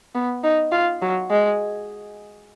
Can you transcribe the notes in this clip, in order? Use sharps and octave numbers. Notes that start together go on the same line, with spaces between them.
B3
D#4
F4
F#3
G#3